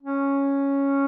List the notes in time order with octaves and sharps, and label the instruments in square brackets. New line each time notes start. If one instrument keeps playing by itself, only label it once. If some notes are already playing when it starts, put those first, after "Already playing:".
[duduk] C#4